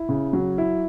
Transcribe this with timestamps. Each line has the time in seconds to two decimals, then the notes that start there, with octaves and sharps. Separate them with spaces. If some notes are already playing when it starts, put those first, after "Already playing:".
Already playing: E4
0.09 C#3
0.33 F#3
0.58 E4